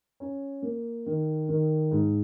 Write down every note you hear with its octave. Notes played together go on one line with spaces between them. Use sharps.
C#4
A#3
D#3
D#3
G#2